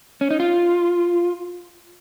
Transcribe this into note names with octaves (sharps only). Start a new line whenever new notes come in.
C#4
D#4
F4